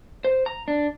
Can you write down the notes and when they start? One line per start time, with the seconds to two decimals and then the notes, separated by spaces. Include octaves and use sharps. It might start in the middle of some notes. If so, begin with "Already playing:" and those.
0.24 C5
0.46 A#5
0.68 D4